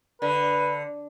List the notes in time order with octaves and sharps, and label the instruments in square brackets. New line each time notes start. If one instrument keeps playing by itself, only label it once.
[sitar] D3 [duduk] B4